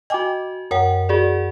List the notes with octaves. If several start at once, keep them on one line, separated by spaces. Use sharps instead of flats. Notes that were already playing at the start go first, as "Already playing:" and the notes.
F#4 D#5 G5 G#5 D6
F#2 A#4 C#5 F#5 G5
F#4 G#4 D5